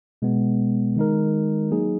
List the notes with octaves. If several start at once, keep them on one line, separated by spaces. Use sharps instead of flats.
B2 G#3 B3
D#3 G#3 D#4 A#4
F#3 A#3 D#4 G#4